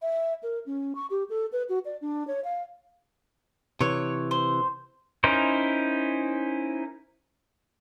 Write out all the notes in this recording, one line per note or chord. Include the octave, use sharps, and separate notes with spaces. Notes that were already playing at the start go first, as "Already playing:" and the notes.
E5
A#4
C#4
C#6
G4
A4
B4
F#4
D5
D4
C#5
F5
C3 E3 C#5
C5
C#4 D#4 E4 A#4 C5